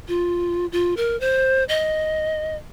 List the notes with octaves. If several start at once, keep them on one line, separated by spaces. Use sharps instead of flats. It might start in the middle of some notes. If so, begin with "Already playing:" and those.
F4
F4
A#4
C5
D#5